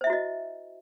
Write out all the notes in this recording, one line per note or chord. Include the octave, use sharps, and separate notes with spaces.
E4 F#4 C5 D#5 E5